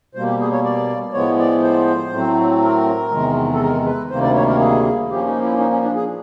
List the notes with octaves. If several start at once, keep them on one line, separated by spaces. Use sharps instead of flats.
B2 G3 A#3 C5
G4
G#4
C#5
D5
A2 F3 G#3 B3 C#5
D5
C5
A2 F#3 A3 C4
A#4
E2 C3 D#3 G#3
A4
A#4
B4
D2 C3 D#3 G3 A#3 C5
D5
C#5
A#4
G#4
A#2 F3 A#3 C#4 G4
D#4
E4
D#4
C#4
D4
G#4